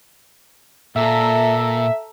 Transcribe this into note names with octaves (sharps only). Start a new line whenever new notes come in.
A#2 A4 E5 A#5